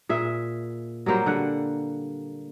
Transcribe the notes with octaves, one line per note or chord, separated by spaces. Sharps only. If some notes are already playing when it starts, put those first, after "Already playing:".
A#2 G#4 E5
F#3 G3 A#3 C5
D3 G3 F#5